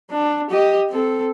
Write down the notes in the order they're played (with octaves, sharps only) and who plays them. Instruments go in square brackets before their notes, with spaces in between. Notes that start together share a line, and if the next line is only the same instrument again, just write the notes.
[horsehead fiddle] D4
G4 D#5
C4 A4